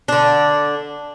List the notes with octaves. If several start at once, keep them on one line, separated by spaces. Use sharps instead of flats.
D3 D4